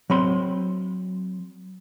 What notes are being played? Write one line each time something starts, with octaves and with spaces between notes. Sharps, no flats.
F#3 C4 B5 C6